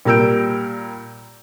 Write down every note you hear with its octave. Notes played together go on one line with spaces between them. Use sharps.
A#2 G3 A#4 E6 G6 D7